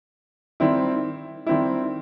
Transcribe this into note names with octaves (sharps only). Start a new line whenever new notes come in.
D#3 G3 C4 E4
D#3 G3 C4 E4